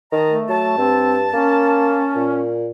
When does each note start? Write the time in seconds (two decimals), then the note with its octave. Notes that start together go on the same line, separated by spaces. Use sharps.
0.12 D#3 D#5 A5 A#5
0.29 A3
0.49 F#3 A5
0.78 G2 C4
1.33 A#3 C#4
2.15 A#2